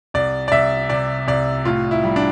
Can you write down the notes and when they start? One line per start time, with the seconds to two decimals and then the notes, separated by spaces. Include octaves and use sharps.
0.14 C2 D5
0.48 D5
0.52 C2 E5
0.90 C3 D5
1.27 C2 D5
1.65 A2 F4
1.91 E4
2.04 G3
2.16 D4